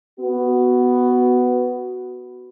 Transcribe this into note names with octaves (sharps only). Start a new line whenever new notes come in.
B3 F#4